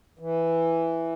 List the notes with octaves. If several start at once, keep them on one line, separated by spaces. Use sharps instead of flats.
E3